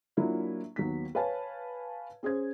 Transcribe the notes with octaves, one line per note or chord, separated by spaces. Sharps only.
F#3 A#3 D4 E4 F4
D#2 F#3 B3 B6
B4 C#5 F5 G#5 A5
C#4 G#4 C5 G#6